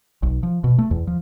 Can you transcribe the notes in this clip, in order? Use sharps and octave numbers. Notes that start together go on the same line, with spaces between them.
B1
F3
B2
A3
E2
F3